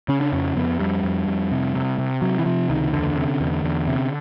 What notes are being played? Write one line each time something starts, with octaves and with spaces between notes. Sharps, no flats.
C#3 C#4
D4
F2 C#4
F2 B3
F2 G3
F2
F2
C3
C3
C3
C3 F#3
E3
C3 F3
C#2 D#3
E2 D3
C3
E2
E2
C3